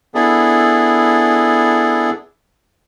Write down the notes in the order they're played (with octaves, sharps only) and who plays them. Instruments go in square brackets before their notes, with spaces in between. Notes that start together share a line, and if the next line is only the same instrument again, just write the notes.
[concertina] B3 D4 E4 G#4 A4